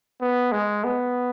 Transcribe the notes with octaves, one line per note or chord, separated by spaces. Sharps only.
B3
G#3
B3